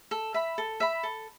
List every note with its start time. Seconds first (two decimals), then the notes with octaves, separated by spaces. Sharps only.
0.11 A4
0.34 E5 B5
0.58 A4
0.80 E5 B5
1.03 A4